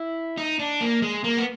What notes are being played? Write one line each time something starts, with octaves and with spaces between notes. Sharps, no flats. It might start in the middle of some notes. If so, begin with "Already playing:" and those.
Already playing: E4
D#4
D4
A#3
G#3
A#3
B3